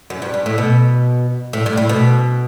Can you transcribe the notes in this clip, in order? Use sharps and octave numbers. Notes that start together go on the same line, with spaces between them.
F#2
G2
G2
A2
B2
A2
G2
A2
B2